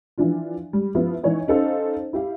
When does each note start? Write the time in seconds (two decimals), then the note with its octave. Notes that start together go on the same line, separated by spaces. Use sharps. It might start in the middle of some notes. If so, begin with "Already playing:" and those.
0.18 E3 F3 D4 F4
0.73 G3
0.95 F3 B3 E4 F4
1.23 E3 D#4 C#5 D#5
1.48 C#4 D#4 A4 C5 F5
2.13 E4 G4 F5